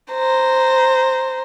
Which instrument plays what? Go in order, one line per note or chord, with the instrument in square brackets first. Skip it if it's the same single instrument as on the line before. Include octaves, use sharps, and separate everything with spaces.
[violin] C5 A#5